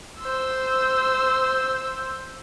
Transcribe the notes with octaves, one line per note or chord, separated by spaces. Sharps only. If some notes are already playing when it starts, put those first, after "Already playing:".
C5 E6